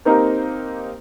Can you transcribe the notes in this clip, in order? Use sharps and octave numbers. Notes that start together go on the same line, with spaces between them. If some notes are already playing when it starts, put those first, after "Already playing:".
A#3 C4 D#4 G4 A#4